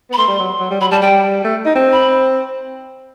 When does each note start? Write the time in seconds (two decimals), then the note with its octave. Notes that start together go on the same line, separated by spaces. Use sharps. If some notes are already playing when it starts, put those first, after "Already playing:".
0.10 B3
0.13 B5
0.17 A3 C6
0.28 G3
0.39 F#3
0.60 F#3
0.71 G3
0.80 F#3 B5
0.91 G3 A5
1.02 G3 G5
1.44 A3
1.65 D#4
1.75 C4
1.92 B5